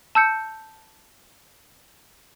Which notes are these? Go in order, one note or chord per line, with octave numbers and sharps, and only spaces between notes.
A5 E6 G6 C#7